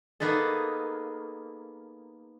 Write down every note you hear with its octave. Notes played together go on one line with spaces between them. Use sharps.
A#3 B3 D#4 G#4 A4